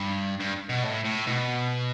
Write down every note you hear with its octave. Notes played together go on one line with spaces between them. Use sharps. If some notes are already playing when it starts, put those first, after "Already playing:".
Already playing: G2
G2
B2
A2
A2
B2